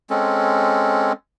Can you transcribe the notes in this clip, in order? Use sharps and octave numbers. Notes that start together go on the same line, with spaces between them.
G#3 C4 C#4 A4